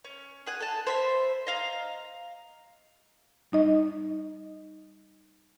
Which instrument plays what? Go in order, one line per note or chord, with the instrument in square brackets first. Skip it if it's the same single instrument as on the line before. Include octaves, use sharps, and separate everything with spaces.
[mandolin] C#4
G#4 F#5 G#5
A4 A5
C5 E5 B5
D#5 F5 A#5
[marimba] G3 D#4 D#5